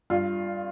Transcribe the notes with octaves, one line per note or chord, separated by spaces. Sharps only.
G2 F4